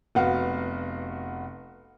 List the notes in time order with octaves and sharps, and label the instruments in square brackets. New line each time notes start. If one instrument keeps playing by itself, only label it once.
[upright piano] F1 B3 F#4 F5